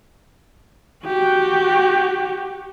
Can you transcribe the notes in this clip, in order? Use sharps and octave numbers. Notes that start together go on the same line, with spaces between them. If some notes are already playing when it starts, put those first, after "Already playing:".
F#4 G4